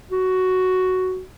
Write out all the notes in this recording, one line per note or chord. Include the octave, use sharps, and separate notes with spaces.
F#4